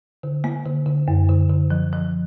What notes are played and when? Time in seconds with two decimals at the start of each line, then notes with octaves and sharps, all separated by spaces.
0.23 D3
0.44 A#3
0.66 D3
0.86 D3
1.08 F#2
1.29 D3
1.49 D3
1.70 F3
1.93 F3